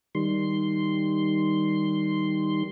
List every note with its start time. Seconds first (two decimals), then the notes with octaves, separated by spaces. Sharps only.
0.15 D#3 G3 C6